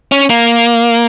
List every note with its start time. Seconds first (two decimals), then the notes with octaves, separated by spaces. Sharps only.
0.12 C#4
0.30 A#3